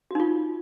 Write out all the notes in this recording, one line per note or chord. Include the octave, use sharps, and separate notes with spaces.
D#4 F4 F#4